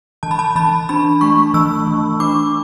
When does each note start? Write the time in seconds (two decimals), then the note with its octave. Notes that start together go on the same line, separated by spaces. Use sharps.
0.23 E3 A5
0.31 B5
0.39 A5
0.56 E3 B5
0.89 D4 B5
1.21 A3 C#6
1.54 E3 E6
1.87 E3
2.20 D4 D6